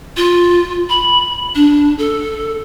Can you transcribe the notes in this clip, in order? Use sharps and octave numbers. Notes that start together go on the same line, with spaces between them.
F4
B5
D4
A4